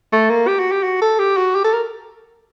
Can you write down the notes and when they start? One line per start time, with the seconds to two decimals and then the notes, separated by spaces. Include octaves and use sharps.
0.12 A3
0.30 A#3
0.47 G4
0.59 F#4
0.71 G4
0.83 F#4
1.01 A4
1.19 G4
1.37 F#4
1.55 G4
1.64 A4
1.73 A#4